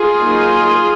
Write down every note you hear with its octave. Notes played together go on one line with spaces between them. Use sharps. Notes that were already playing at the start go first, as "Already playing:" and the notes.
Already playing: F4 G#4
F#3 A#3 D#4